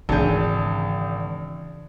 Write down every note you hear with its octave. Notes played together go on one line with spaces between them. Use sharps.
G#1 C#3 E3 D4 G#4 G6